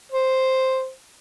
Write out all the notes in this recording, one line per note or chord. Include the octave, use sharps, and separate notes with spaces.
C5